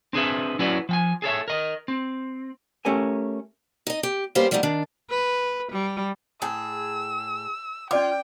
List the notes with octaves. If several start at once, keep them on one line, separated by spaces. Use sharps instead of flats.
C4 D4 G#4 B4 E5
F#3 C#4 E4 F#4 B4 D5
F3 G5 G#5
G#4 A4 C#5 E5
A#4 D#5
C4
A3 C#4 G4 A#4 G#5
D#4 D#5
G4
G3 A#3 B3 C#4 C5 F5
F3 G3 A3 B3 C4 D#4
D#3 D4
B4
G3
A2 G#4 E6
C#4 F4 D5 G5 D6